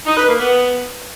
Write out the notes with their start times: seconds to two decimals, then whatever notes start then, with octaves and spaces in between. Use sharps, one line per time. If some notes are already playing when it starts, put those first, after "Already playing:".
0.06 D#4
0.17 B4
0.28 A#3
0.39 B3